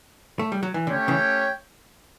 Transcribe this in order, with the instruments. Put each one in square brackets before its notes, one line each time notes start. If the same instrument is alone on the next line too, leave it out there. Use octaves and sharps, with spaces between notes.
[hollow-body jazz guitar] A3
G3
F#3
E3
[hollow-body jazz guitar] D3 [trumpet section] A3 C#4 G4 C#5 G5
[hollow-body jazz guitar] C#3 E3